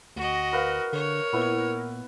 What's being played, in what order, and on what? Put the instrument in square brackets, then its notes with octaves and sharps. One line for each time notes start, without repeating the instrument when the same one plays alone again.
[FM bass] D2 [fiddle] F#4 D#5
[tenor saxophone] A#4 [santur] B4 F5
[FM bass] D3 [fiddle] C#5
[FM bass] A#2 [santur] B3 E4 B4